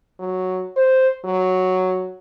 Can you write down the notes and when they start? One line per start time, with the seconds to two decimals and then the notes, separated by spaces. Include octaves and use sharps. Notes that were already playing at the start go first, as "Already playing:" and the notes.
0.20 F#3
0.77 C5
1.25 F#3